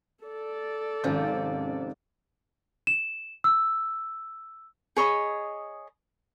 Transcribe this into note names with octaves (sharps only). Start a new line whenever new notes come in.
A4 D5
G#1 C3 D#3 F3 C#4 G6
E7
E6
G#4 C#5 D#5 B5